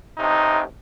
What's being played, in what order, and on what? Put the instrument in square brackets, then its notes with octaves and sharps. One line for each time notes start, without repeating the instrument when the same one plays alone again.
[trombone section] A1 C3 D#4